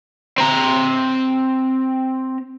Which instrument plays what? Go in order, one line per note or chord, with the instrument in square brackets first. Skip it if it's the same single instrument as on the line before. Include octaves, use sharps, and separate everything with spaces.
[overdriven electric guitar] C4 A#5